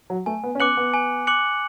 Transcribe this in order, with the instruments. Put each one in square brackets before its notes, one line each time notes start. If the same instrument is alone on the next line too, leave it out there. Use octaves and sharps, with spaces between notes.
[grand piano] F#3
[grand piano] A3 [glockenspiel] G#5
[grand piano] B3
C#4
[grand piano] B3 [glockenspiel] D6 F#6 C#7 F#7
[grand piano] B3
[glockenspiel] G#5
D6 F#6 C#7 F#7